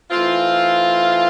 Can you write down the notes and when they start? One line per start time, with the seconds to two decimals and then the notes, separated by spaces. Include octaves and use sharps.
0.10 E3 A3 C4 F4